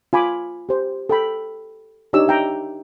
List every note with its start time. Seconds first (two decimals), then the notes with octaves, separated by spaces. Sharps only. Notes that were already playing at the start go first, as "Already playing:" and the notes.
0.13 F4 G#5 B5 D6
0.69 G4 C5
1.09 A4 G5 B5
2.13 D4 D#4 G4 C#5 E6
2.28 E5 G5 A#5